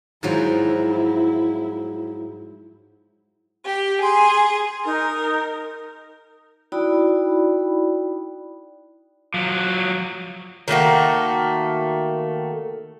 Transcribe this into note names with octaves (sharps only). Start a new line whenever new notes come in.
G#2 F3 F#3 E4
G4
G#4 C6
D#4 A#4
D#4 E4 F#4 D5 G5 B5
F3 F#3
D#3 A3 A#3 F#4